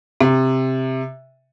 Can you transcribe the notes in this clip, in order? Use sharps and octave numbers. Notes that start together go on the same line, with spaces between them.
C3